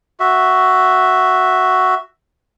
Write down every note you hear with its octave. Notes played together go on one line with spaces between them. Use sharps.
F#4 E5